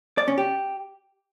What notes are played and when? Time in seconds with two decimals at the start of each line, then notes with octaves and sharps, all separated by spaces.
0.18 D5
0.28 C#4
0.38 G4